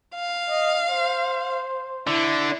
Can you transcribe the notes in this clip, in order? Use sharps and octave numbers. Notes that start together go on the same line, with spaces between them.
F5
D#5
C5
D3 E4